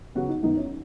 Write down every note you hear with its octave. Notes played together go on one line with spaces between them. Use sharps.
C#3 F#3 B3 F#4
D#4
F#2 D#3 B3 D#4
C#4